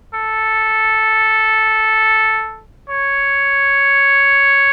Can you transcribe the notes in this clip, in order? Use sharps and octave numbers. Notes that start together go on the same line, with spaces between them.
A4
C#5